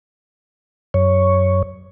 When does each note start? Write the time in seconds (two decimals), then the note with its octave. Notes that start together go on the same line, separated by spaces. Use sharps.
0.94 F#2 C#5